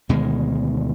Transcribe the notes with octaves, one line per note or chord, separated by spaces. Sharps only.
D2 B2 D#3 G#3